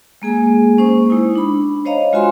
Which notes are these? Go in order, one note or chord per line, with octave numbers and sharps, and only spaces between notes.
G#3 A#3 G#4 G#5
A#3 C#4 C5 C#6
G#3 D#4 E4
D4 B5
C5 C#5 D#5 F5 A#5
G#3 F4 F#4 E5 G#5 C6